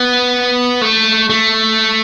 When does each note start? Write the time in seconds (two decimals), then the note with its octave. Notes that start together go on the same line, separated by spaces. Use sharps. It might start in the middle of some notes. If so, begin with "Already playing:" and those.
Already playing: B3
0.81 A3
1.30 A3